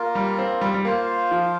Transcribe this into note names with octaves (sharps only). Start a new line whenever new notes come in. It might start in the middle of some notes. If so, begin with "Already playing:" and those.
Already playing: A#3 F4 A#4
G3
C4
G3
G3
A#3 F4 C5 F5
F3